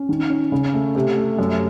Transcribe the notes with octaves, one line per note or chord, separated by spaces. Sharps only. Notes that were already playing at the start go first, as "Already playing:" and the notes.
Already playing: C#4
D#3
C#4
C#3
A3
C3
A3
F#2